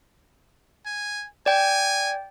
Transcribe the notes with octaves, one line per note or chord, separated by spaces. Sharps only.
G#5
D5 G5 G#5